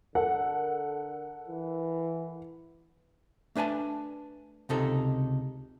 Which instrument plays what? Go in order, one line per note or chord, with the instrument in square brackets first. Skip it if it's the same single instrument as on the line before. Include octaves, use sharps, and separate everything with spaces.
[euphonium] D3 [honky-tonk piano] A4 A#4 F#5
[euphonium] E3
[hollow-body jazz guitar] A3 D4 B4 G#5 A5
C#2 C3 D#4 A4